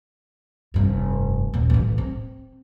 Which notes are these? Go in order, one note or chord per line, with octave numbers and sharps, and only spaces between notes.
F1 G2
D#1
A1 E3
C4